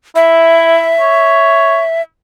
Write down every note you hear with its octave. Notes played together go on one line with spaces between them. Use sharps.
E4 E5
C#5